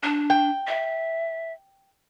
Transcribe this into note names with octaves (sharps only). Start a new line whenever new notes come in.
D4
G5
E5